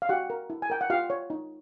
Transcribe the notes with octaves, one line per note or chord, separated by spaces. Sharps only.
F5
F#4 G4 F#5
A#4
E4
G#5
A#4 G5
F#5
F4 G4 F5
C#5
D#4